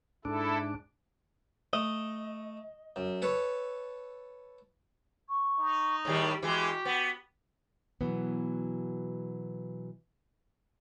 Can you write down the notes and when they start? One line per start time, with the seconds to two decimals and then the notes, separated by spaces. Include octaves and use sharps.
0.25 G#2 D4 E4 A4
1.73 A3 D#5
2.96 F#2
3.22 A4 B4 C#5
5.28 C#6
5.58 D#4
6.05 A2 D#3 G3 G#4
6.42 E3 G#3 F#4 G4
6.85 B3
8.01 B2 E3 F#3 B3